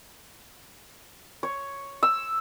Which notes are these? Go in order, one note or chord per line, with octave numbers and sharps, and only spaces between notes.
C#5
E6